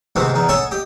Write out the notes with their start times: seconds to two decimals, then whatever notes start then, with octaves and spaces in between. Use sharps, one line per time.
0.16 G#2 C3 D#3 B3 C4
0.34 E2 D#4
0.49 A4 C#5 D#5 F#5 G#5 A5
0.71 G4 D#5